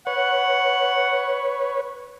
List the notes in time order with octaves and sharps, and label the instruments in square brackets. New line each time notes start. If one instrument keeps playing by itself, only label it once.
[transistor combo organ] B4 C#5 [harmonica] F#5